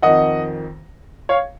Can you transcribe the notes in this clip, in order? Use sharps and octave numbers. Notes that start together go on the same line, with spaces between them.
F2 D#3 D#5 F#5
C#5 F5